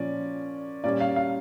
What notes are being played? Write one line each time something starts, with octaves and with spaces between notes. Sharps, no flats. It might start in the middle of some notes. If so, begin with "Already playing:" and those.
Already playing: A#2 F3 C#4 D5
A#2 G3 C#4 D5
F5
F5